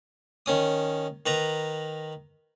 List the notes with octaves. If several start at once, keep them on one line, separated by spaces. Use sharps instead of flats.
D#3 C#4 D#6
D#3 B4 A#5